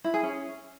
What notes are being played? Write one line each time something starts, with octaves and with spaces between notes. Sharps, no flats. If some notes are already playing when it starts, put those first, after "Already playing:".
E4
G#4
C#4